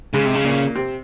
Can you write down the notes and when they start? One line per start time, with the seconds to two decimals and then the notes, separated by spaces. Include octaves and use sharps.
0.14 G#2 C#3 G#3
0.25 C3
0.35 C#3
0.45 A#2 A#3
0.75 C3 C4